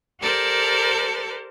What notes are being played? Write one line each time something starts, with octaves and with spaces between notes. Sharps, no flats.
G4 A4 A#4 C5 D5 A5